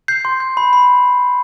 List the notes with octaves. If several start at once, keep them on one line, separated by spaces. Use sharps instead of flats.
G6 C7
C6
G6
B5
B5